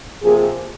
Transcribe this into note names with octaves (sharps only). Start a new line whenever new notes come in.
C3 F3 A#3 G#4